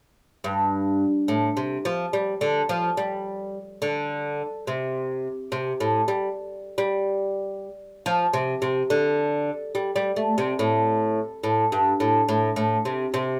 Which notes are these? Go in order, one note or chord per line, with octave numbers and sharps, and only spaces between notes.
G2
A2
C3
F3
G3
D3
F3
G3
D3
C3
C3
A2
G3
G3
F3
C3
C3
D3
G3
G3
A3
C3
A2
A2
G2
A2
A2
A2
C3
C3